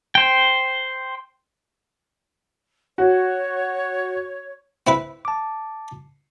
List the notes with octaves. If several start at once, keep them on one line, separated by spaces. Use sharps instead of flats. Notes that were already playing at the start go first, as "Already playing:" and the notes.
C5 G5
F#4 C#5
C4 E4 B4
A5 D6